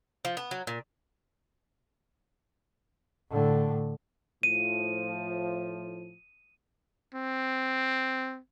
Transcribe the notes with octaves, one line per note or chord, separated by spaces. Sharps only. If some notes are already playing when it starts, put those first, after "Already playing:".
F3
B3
F#3
A#2
A2 D3
A2 F3 D#7
C4